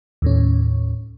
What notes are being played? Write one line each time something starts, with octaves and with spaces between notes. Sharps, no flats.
D#2 A2 C#4